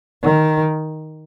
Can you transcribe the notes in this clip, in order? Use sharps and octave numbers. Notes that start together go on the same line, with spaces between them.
D#3